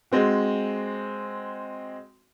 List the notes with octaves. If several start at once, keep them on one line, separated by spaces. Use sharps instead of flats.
G#3 C4 F#4